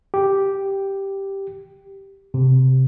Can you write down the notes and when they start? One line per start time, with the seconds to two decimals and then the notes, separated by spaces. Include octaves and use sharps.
0.14 G4
2.34 C3